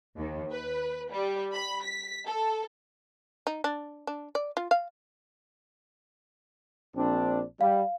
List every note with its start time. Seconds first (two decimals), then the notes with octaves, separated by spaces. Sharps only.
0.16 D#2
0.51 B4
1.11 G3
1.53 B5
1.83 B6
2.25 A4
3.47 D#4
3.64 D4
4.07 D4
4.35 D5
4.57 F4
4.71 F5
6.96 A#1 C4 D4
7.61 G3 F5